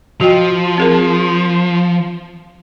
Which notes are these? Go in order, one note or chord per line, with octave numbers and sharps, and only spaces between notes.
F3 F#4 D#5 G5
C4 G#4 A#4